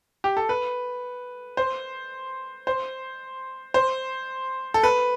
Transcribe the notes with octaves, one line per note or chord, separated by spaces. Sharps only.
G4
A4
B4
C5
C5
C5
A4
B4